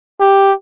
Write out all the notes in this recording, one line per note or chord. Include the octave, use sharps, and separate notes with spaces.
G4